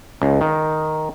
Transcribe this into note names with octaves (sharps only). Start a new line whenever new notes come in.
C#2
D#3